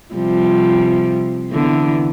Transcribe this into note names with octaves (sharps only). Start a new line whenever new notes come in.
C3 F3 G3
D3 E3 B3